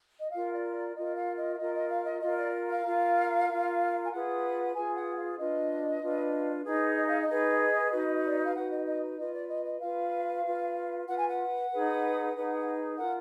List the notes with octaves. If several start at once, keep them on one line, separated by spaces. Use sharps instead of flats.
D#5
F4 A#4 F5
D5
D5
F4 A#4 D#5
F5
D#5
F5
F4 A#4 D#5
D#5
F5
D#5
F4 A#4 D#5
D5
F5
F4 A#4
F4 A#4
G#5
F4 G#4 B4 F#5
F4 G#4 B4 G#5
F#5
F5
D4 F4 B4 D#5
D4 F4 B4
D#4 G#4 B4
D#5
F5
D#5
D#4 G#4 B4
D#4 F#4 B4
D5
D#5
F5
D#4 F#4 B4 F#5
D#5
D#5
F4 B4 D#5
D5
D#5
D#5
F4 B4 F5
F4 B4
F4 B4 F#5
G#5
F#5
D#4 G#4 B4
D#4 G#4 B4
F4 A#4 F#5